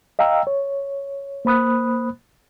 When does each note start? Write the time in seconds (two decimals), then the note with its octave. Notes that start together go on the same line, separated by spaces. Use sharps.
0.19 D#5 F5 G5 A#5 E6
0.47 C#5
1.45 A#3 C5 B5 D#6 F#6